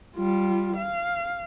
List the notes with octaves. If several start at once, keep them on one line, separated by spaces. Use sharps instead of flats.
G3 F4
F5